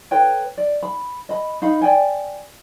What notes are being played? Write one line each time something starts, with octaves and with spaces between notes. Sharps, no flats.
A4 B4 C#5 G5
D5
B5
D#5 B5
D#4 F5 B5
D5 G5 G#5